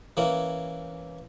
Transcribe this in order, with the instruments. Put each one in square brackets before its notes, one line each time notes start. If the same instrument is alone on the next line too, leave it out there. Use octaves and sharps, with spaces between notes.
[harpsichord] E3 A#3 C#4 E4